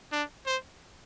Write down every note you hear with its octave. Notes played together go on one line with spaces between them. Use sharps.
D4
C5